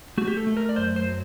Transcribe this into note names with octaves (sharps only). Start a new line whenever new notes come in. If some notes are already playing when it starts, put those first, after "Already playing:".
A3 F#4
G4
A4
A3
A#4
D5
F#2 C5
C5
F#3